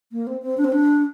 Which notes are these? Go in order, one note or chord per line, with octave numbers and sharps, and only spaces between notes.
A#3
C4
C4
D4
C4
D4